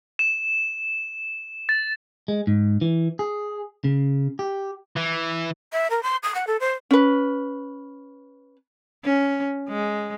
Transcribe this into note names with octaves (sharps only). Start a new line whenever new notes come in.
E7
A6
G#3
G#2
E3
G#4
C#3
G4
E3
E5
A#4
C6
D#6
F#5
A4
C5
C#4 B4
C#4
G#3